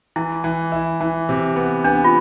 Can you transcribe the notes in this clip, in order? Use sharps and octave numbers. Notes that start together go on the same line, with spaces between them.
E3 E4
E3
E4
E3
C3
B3
B3 D4
F4